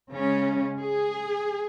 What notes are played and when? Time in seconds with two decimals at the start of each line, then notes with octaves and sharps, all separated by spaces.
0.12 C#3 G#3 C#4
0.80 G#4